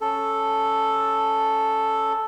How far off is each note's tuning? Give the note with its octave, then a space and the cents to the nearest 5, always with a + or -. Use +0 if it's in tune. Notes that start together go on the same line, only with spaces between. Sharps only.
C#4 +0 A4 +0